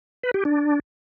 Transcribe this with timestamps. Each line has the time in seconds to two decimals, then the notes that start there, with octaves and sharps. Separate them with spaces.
0.23 B4
0.34 G4
0.45 D4